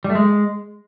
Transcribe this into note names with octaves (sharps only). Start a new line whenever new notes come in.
G3
A3
G#3